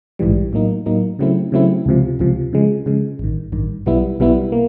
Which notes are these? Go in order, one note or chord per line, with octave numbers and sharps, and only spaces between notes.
A#1 G#2 E3 G3
A2 F#3 A#3 D#4
A2 F#3 A#3 D#4
C#3 F#3 A3 C4 E4
C#3 F#3 A3 C4 E4
C#2 C3 F3
C#2 C3 F3
C#3 F3 G#3
C#3 F3 G#3
A1 G2 D#3
A1 G2 D#3
B1 B2 G3 B3 E4
B1 B2 G3 B3 E4
A#3